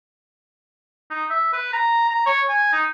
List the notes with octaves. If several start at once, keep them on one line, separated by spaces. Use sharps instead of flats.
D#4
E5
B4
A#5
A#5
C#5
G#5
D#4